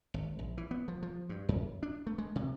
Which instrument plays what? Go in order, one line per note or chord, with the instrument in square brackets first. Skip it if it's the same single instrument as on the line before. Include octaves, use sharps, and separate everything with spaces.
[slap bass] G#1
A#1
E3
B3
F3
F3
G2
F#2
D4
A3
G#3
C3